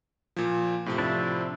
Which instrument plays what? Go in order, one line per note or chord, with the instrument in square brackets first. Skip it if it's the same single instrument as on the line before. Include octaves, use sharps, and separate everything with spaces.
[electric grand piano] A#2 F3
A2 C3 F3
[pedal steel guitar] C4 D4 E4